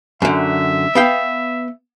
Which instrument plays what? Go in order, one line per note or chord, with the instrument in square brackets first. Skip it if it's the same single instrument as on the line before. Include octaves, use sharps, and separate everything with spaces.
[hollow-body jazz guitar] F#2 D3 [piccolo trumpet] E5
[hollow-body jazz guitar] B3 F5 G5